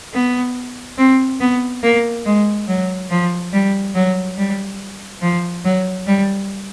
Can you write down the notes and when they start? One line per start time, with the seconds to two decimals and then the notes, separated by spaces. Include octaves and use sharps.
0.13 B3
0.98 C4
1.40 B3
1.83 A#3
2.25 G#3
2.68 F#3
3.10 F3
3.53 G3
3.95 F#3
4.38 G3
5.22 F3
5.65 F#3
6.07 G3